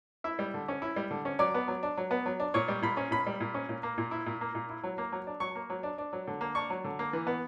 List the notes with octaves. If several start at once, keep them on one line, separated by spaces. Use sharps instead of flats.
E4 E5
G3
D3
C#4
E4
G3
D3
C#4
F#3 D5
B3
F#3
D4
F#3
B3
F#3
D4
A#2 C#5
G3
A#2 B5
C#4
A#2 B5
G3
A#2
C#4
A#2
A#3
A#2
E4
A#2
A#3
A#2
E4
F#3
A#3
F#3
D4
F#3 C#6
A#3
F#3
D4
D4
F#3
D3
A#3
D4 C#6
F#3
D3
A#3
E3
B3